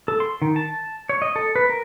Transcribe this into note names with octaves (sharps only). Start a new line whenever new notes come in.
A4
C6
D#3
A5
C#5
D#5
A4
B4
A#4